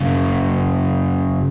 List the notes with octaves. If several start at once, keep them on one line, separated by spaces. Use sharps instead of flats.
F#2 C#3